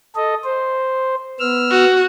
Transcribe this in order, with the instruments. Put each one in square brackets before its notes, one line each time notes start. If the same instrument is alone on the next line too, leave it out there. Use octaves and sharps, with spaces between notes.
[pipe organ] A4 D#5
C5
B3 E6 F6
[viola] F#4